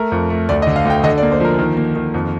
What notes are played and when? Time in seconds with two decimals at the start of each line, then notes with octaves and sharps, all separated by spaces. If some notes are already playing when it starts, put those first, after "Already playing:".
Already playing: A3 A#4
0.12 F2
0.30 A3
0.49 D2 D5
0.62 D#5
0.67 D3
0.76 F5
0.85 D2 G5
1.03 D3 D#5
1.18 D5
1.23 A#3
1.32 C5
1.40 F3 A#4
1.59 D#3
1.77 A#3
1.96 D#3
2.14 F2